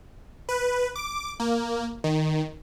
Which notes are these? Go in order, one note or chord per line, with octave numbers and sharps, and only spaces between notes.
B4
D6
A#3
D#3